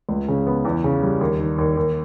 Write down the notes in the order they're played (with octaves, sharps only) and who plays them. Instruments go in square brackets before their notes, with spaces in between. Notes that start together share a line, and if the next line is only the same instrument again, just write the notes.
[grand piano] C#2
C#3
B3
E2
C#3
G3
D#2
D#3
D#2
D#2